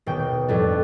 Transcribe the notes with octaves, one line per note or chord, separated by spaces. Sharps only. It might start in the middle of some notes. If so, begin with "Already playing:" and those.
D#1 B2 G5
F2 A2 G3 D4